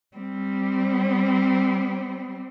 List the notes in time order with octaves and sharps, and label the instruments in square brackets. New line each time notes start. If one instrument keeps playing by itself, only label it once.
[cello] G3 C4